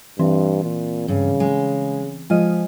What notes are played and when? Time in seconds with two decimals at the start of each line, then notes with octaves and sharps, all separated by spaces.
0.19 G2 E3 C4
0.64 A#2
1.08 G2 C#3
1.40 G#3
2.30 F3 G#3 F4 D#5 G#5